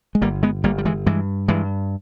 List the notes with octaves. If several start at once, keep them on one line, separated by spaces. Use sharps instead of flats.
G#3
G1 G3 A#3
G#3 B3
G1 G3 A#3
G3
E3 G#3
G2 E3 G#3
G2 E3 G#3